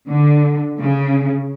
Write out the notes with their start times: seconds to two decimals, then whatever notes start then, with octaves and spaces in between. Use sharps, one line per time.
0.10 D3
0.79 C#3